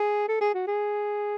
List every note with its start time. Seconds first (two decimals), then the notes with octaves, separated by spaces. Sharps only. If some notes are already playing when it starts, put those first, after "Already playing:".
Already playing: G#4
0.28 A4
0.41 G#4
0.54 F#4
0.67 G#4